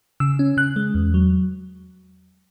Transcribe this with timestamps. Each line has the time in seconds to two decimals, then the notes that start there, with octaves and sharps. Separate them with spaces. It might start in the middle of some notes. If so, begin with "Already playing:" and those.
0.20 C#3 E6
0.39 C#4
0.57 C#3 F#6
0.76 G#3
0.95 E2
1.14 F#3